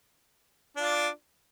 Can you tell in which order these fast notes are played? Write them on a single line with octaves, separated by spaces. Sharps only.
D4 F4 D5